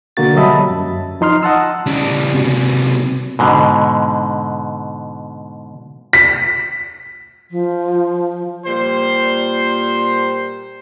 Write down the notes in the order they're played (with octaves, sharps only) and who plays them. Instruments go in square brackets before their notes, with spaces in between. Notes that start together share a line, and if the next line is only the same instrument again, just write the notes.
[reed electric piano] B2 D3 A#3 F#4 A6
F#3 G3 D#5 E5 A5 B5
F#2
F3 D#4 C6 F6
D#5 F#5 A5 E6
[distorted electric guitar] C#3 G3
C3 F#3
[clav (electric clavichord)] G#2 B2 D3
[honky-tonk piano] B6
[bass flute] F3
[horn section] A#2 G3 C5